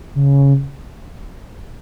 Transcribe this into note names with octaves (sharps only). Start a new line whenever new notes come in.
C#3